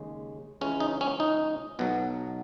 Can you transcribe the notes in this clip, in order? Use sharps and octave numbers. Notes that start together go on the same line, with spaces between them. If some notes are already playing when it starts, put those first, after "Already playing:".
Already playing: D#2 C#3 G#3
C#2 C#3 E3 G#3 C#4
D#4
C#4
D#4
B1 B2 F#3